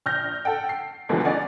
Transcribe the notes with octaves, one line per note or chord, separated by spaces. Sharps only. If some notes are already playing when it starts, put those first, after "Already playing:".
A#1 F6 G6 A#6
A4 F#5 G5
C7
D2 G2 B2 E3 F3 G#3
C#4 D5 D#5 F#5 G#5